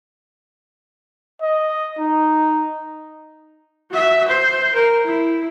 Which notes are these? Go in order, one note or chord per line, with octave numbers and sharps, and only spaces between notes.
D#5
D#4
F#4 E5
C5
A#4
E4